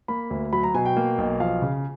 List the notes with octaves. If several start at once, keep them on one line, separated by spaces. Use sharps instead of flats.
A#3 B5
D2
F#3 B5
A#5
B2 G#5
G5
A#3
B1
F3 F5
C#3